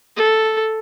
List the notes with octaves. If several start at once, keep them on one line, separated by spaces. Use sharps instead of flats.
A4